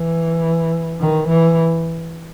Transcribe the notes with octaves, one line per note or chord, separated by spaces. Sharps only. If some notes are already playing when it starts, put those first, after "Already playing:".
Already playing: E3
D#3
E3